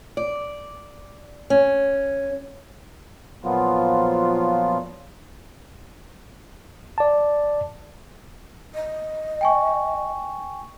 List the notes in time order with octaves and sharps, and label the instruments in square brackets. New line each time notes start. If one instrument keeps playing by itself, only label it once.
[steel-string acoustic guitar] D5
C#4
[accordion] A#2 F3 F#3 B3 F4
[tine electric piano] D5 A5
[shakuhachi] D#5
[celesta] G5 G#5 C#6